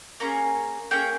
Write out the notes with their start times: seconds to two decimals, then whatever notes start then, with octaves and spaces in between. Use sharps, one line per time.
0.20 A#3 C#4 G#4 A#5
0.91 A#3 C#4 G#4 G5